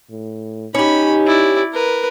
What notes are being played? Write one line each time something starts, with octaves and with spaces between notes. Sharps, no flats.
A2
C#4 D#4 G4 B5
E4 D5
A#4 B4